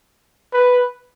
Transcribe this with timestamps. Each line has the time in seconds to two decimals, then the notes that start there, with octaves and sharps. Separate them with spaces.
0.53 B4